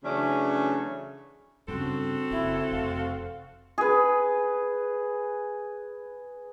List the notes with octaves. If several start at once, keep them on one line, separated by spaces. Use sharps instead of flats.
C#3 E3 F#3 A3 C#4 D4
G2 C#3 C4 F#4 A4
F#1 E4
F1 F5
G#4 B4